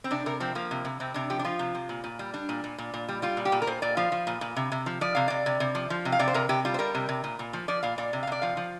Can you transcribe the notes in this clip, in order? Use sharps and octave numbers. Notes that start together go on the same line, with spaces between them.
C4
C3 D4
C3 A#4
F3 C4
F3 A#3
C3
C3
C3 C4
C3 D4
F3 G4
D4
F3 F4
C3
C3
A#2
A#2
G3
G3 D4
A#2
A#2
A#2
A#2
G3
G3 F4
A#2
G4
A#2
A#4
A#2 C5
A#2 D5
F3 F5
F3
A#2
A#2
C3
C3
F3
F3 D5
C3 F5
C3 D5
C3
C3
F3
F3
C3
F5
C3 D5
C5
C3 A#4
C3 G4
G3 F4
C5
G3 A#4
C3
C3
A#2
A#2
F3
F3 D5
A#2 F5
A#2 D5
C3
F5
C3 D5
F3 F5
F3